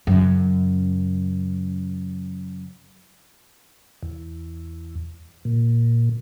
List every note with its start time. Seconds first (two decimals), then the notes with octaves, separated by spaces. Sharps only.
0.07 F#2 C#3
4.03 E2
5.45 A#2